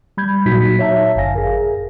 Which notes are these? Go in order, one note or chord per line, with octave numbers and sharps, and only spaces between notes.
G3 B5 G6 G#6
A#2 F#3 D#4 F#4 B6
C#5 E5 A5 A#5
G1 F#2 F5 G#5 A#6
G#4 A#4